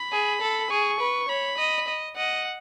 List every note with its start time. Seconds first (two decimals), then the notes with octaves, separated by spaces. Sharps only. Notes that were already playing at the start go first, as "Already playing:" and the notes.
Already playing: B5
0.12 G#4
0.41 A4
0.70 G#4 C#6
1.00 B4
1.28 C#5 B5
1.58 D#5
1.88 D#5
2.16 D#5 F#5